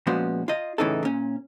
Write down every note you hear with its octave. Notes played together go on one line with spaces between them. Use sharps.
A#2 F3 G#3 B3 C#4 F#4
F4 D#5
A2 C#3 E3 D#4 A4
A#2 C#4